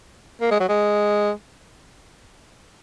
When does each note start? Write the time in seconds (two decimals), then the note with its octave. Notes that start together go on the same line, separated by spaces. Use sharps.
0.41 A#3
0.51 G#3
0.60 F#3
0.69 G#3